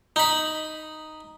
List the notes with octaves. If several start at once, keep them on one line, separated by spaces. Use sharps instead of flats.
D#4 B5